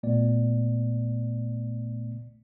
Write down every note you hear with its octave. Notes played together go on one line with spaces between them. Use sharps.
A#1 A#2 A3 B3 D5